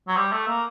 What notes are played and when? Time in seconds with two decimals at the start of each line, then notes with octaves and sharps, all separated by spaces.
0.08 F#3
0.17 G3
0.32 A3
0.48 A#3